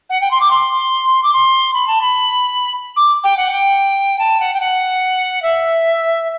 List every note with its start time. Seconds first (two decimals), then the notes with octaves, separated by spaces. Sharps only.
0.10 F#5
0.21 G5
0.31 C6
0.41 D6
0.51 C6
1.23 D6
1.33 C6
1.74 B5
1.88 A5
2.01 B5
2.96 D6
3.24 G5
3.37 F#5
3.52 G5
4.19 A5
4.40 F#5
4.54 G5
4.61 F#5
5.42 E5